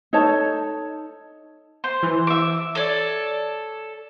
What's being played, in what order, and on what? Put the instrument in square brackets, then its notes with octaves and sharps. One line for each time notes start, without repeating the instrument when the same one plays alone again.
[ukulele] D#4 A4 C#5 A5
[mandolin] C5
[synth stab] E3
[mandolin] E5 D6
A4 C#5 D5